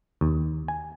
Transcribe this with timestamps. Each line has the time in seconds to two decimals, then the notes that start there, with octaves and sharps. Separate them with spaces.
0.21 D#2
0.68 G#5